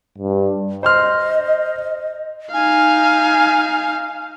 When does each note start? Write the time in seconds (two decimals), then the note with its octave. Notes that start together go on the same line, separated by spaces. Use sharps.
0.19 G2
0.83 C5 D#5 C6 F6
2.54 D#4 F5 G#5